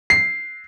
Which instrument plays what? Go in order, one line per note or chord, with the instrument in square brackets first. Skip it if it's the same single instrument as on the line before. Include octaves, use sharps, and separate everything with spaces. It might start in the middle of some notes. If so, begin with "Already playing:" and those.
[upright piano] C7